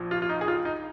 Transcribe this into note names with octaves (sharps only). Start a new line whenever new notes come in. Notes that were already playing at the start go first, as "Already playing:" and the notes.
Already playing: A#1 A#2 F3
F4
F4
D#4
G#4
F4
D#4